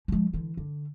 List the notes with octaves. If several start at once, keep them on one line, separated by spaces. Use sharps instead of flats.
F3 G#3
D3 E3
D3